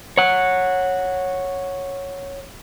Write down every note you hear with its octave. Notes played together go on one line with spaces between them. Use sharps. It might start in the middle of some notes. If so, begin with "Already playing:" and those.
C#5 F#5